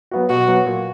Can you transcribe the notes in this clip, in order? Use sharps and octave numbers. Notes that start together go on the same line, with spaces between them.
F#3 B3 F#4
B2 F#4
F#3 B3 F#4
A#2